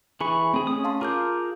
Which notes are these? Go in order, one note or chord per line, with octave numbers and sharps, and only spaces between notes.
E3 G#4 B5 C#6
A3 C4 G#4
C#4 D#6
F5 A5 C6
F4 G#4 A#4 A#5 D6 G6